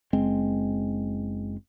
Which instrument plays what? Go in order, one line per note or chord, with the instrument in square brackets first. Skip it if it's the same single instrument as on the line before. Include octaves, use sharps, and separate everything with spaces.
[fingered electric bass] F#1 G#3 C4